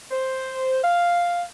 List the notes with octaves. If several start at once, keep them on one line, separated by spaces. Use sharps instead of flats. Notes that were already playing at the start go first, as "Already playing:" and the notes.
C5
F5